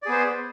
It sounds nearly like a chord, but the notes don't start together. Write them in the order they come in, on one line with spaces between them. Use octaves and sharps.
D5 G#4 B3 C5